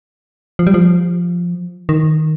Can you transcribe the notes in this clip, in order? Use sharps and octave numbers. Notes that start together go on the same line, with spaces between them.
F3
G3
F3
D#3